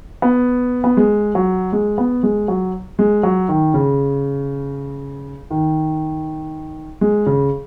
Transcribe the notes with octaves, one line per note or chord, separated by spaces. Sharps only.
B3
B3
G#3
F#3
G#3
B3
G#3
F#3
G#3
F#3
D#3
C#3
D#3
G#3
C#3